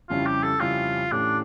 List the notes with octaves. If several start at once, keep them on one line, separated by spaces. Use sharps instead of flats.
F2 C#3 G3 C#4 E4 F4
G4
A4
F2 C#3 G3 C#4 E4 F4
A2 E3 A3 C#4 D4 G4